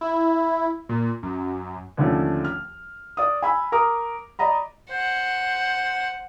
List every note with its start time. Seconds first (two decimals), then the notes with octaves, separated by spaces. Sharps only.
0.01 E4
0.89 A#2
1.23 F#2
1.97 D#2 D3 F3 A3 C#4
2.44 F6
3.17 D5 D#6
3.42 G#5 B5 E6
3.72 A#4 A#5 D6 D#6
4.39 D5 D#5 A#5 B5
4.91 C5 F#5